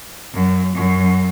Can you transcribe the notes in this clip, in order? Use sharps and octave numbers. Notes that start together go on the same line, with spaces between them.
F#2
F#2